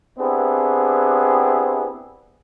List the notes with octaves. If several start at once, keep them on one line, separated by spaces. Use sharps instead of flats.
B3 C4 D4 E4 G4 G#4